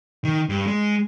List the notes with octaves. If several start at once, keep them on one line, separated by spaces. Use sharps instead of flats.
D#3
G2
G#3